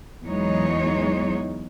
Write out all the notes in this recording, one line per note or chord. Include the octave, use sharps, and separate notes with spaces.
E2 E3 F#3 G#3 D#4 C#5